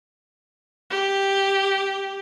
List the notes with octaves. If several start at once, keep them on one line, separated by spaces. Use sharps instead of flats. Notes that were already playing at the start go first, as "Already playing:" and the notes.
G4